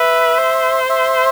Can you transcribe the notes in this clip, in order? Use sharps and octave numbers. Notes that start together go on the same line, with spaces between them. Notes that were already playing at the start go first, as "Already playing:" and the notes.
Already playing: B4 E5
C5
E5